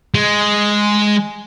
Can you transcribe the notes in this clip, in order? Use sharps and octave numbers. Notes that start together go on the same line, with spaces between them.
G#3